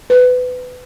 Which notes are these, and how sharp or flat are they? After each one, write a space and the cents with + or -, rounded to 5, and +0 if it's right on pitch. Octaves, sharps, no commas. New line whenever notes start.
B4 +25